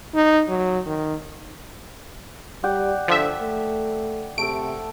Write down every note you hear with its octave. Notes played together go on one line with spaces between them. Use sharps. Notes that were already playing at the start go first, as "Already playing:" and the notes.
D#4
F#3
D#3
G3 D5 F#5 G5
D3 F3 E5
A3
C3 A3 A4 D7